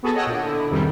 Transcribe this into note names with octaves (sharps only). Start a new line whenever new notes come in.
B3 F#4 G#4 A4 A5
C#5 D#5 F#5 G5 E6
A#2 D3
D3 E4
F2 G#2 C3 D#3 G3